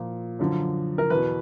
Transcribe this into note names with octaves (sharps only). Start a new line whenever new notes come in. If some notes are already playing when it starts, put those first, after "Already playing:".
Already playing: A#2 F3
F#2 D3 F3
A#4
E2 B2 B4